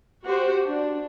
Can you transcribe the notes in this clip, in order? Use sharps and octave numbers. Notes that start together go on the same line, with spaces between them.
F#4 G4 C5
D4